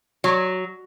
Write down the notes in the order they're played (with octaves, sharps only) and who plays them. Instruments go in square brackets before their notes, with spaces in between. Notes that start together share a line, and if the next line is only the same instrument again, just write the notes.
[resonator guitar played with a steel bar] F#3